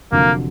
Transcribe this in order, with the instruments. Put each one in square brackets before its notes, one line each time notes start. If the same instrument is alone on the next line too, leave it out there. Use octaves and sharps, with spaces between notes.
[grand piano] F1 F2 D3 F#3 [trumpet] A#3